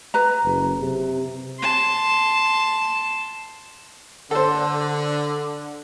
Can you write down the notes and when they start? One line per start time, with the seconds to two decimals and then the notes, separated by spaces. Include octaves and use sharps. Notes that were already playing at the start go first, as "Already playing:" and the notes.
0.14 B4 A#5
0.43 F#1
0.81 C3
1.59 A5 C6
4.31 D3 A4 C5